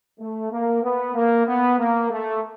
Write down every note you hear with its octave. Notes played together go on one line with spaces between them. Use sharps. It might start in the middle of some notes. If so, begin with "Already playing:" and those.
A3
A#3
B3
A#3
B3
A#3
A3